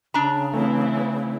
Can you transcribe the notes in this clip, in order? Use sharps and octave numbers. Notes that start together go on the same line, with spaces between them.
C#3 D4 A#5
E3 A3 C4 E4